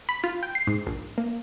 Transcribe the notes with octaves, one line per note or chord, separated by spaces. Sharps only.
B5
F4
G5
C7
G#2
A#1
A#3